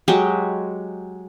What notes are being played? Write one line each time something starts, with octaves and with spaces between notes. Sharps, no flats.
F#3 G#3 G4